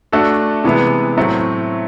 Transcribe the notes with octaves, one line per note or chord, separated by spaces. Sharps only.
A3 D4 F#4 A4
C3 E3 G#3 B3 E4
A2 F#3 A3 C4